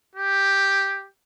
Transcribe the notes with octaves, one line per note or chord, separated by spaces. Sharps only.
G4